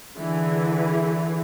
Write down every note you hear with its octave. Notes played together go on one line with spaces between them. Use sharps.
D3 E3 G#4